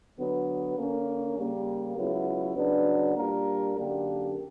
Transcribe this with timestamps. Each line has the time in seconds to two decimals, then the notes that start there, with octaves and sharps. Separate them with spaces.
0.17 D3 F#3 B3
0.76 D3 A#3 C#4
1.35 C#3 G3 A#3
1.95 C#2 C#3 F#3 B3 E4
2.55 C#3 F#3 B3 D4
3.14 A#2 G3 A#3 D4 A#4
3.74 F#2 D3 A#3 D4 G4